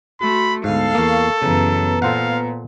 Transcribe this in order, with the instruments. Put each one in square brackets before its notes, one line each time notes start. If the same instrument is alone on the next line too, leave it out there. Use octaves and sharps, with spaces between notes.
[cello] A3 [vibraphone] F#4 C6 [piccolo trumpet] B5
[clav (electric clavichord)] D2 G#2 [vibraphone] G#3 B3 [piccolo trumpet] A4 [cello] F5
[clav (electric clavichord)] E2 A#3 [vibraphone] A#4 C#6
[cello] F#2 E3 [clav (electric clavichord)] C#3 [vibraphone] B3 B4 A#5
[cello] A#2 [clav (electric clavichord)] A4 C5 F#5 [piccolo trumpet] F5